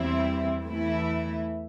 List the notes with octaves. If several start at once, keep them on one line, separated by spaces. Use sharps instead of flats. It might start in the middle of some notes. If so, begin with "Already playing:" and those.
Already playing: E2 E3 G3 C4 E4
E2 E3 A3 E4